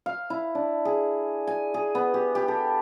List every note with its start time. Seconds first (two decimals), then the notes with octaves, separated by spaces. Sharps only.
0.06 F5
0.30 E4
0.55 D4
0.85 G#4
1.47 G#5
1.74 G#4
1.95 B3
2.14 G4
2.35 G4
2.48 A4